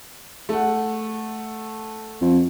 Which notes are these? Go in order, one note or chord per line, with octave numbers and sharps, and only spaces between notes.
A3 F#5
F2